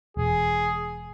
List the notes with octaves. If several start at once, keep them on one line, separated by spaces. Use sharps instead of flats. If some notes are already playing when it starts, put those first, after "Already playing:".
E1 G#4